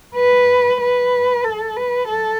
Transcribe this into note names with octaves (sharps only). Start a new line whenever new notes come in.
B4
B4
A4
B4
A4